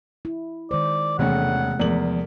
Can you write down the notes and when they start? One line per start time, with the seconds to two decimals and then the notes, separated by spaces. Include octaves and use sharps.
0.25 E4
0.71 D#3 G#3 C5 D5
1.19 E1 C3 E3 A3 C#4 F#5
1.80 E2 F3 G#3 A3 A#4 D5 F#7